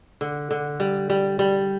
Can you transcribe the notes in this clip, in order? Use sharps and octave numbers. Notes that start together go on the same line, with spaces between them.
D3
D3
G3
G3
G3